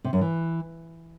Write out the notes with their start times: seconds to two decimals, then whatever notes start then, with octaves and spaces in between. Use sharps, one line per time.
0.04 C3
0.13 F#2
0.21 E3